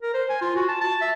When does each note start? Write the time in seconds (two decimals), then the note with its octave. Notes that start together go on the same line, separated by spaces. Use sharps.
0.02 A#4
0.14 C5
0.29 G#5
0.41 F4
0.56 F#4
0.68 A5
0.81 A5
1.01 E5